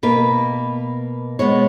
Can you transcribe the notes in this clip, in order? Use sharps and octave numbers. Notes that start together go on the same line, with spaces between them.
B2 A#3 B4
B2 G#3 B3 C#5